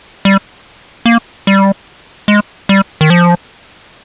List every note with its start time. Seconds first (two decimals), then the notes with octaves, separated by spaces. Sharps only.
0.25 G3
1.06 A#3
1.47 G3
2.28 G#3
2.69 G3
3.01 D#3
3.10 F3